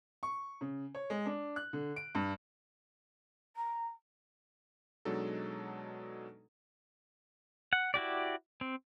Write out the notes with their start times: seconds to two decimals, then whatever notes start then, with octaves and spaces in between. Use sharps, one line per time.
0.23 C#6
0.61 C#3
0.95 C#5
1.10 G#3
1.26 D4
1.56 F#6
1.73 D3
1.96 D7
2.15 G2
3.56 A#5
5.05 B2 F#3 G#3 D4 D#4 A4
7.73 F#5
7.94 E4 F#4 G4 D5
8.61 C4